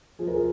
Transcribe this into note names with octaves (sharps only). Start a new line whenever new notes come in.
F3 G#4
A#4
G#4